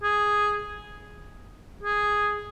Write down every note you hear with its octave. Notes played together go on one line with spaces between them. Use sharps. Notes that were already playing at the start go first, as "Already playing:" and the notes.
G#4
G#4